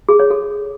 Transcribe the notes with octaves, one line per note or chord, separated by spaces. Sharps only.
G#4
C#5
A4